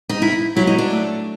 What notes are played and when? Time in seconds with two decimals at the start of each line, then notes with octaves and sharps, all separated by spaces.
0.09 D#4
0.22 E4
0.56 F#3 E4
0.67 D#4
0.78 D4
0.90 A3